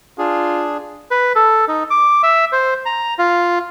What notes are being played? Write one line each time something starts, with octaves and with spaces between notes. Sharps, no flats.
D4 F4 G#4
B4
A4
D#4
D6
E5
C5
A#5
F4